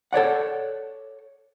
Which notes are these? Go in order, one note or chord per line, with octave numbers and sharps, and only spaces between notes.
A4 C#5 D5 F#5